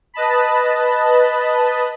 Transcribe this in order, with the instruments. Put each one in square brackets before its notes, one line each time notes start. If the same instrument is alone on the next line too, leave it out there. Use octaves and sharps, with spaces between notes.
[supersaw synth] B4 D#5 A5 B5